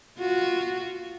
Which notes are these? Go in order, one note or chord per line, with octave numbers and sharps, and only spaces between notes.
F4 F#4